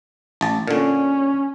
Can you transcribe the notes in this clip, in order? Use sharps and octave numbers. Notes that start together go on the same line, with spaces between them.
A1 A5
A#2 D3 C#4